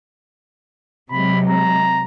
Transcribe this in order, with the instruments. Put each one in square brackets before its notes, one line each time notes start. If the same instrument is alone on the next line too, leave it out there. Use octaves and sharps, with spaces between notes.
[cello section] C3 F#3 G#3 [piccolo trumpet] B5
[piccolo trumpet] A#5